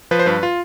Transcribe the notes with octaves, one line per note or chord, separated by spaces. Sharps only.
F3 B4
C5
G2 B4
F4